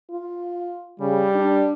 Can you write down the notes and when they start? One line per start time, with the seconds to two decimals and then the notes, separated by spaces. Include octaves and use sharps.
0.10 F4
1.00 C#3 G3
1.35 D4